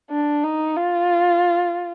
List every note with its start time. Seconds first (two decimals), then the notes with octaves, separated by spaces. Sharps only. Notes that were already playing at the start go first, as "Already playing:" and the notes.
0.11 D4
0.44 D#4
0.77 F4